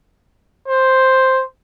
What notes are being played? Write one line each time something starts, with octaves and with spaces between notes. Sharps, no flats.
C5